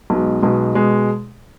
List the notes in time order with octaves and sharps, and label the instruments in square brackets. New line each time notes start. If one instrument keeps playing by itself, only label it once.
[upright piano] B1 B2 G#3
B1 B2 G#3
B2 G#3